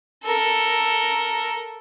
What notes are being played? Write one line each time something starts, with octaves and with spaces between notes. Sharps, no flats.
A4 A#4